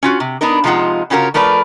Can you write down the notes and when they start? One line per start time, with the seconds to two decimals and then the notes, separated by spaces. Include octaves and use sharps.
0.03 C#4 F4 F#4
0.20 C3
0.41 B3 D4 D#4 A#4
0.64 C3 F3 G#3 D#4 F4 F#5
1.10 C#3 C#4 F4 F#4 G#4 A#4
1.34 F3 A3 A#4 B4 D5